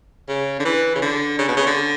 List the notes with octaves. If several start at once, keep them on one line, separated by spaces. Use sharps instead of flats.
C#3
D3
E3
C#3
D3
C#3
B2
C#3
D3